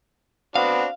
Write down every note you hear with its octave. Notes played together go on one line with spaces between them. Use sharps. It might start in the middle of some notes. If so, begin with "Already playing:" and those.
B3 C4 D4 F#4 F5